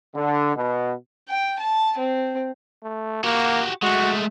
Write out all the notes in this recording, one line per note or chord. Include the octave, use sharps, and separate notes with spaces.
D3
B2
G5
A5
C4
A3
A#3 F#4 G4
G#3 A3 F#4